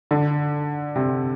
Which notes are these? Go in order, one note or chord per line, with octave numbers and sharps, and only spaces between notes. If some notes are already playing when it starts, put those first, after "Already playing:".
D3
C3